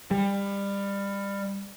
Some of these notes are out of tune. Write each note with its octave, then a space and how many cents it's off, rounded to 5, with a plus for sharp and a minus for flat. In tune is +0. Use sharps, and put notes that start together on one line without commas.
G3 +25